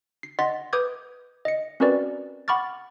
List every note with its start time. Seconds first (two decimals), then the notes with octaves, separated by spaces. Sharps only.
0.23 C7
0.39 D#5 F#5 C6 A6 B6
0.73 B4 D6 D#6 G6 G#6
1.45 D#5 C#7
1.80 C4 C#4 F#4 A#4 B4 D5
2.48 F#5 B5 C#6 D6 F6 A6